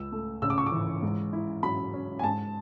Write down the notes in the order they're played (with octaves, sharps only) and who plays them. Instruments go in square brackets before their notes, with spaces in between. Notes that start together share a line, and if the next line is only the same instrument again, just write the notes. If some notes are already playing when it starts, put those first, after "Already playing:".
Already playing: [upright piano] C#2 E6
A3
C#3 E6
D6
C#6
D6
E3
G#2
E4
F#3 B5
C#4
G#5
G#2 A5